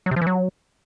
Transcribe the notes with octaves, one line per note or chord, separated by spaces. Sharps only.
F#3
C3
F3
E3
F#3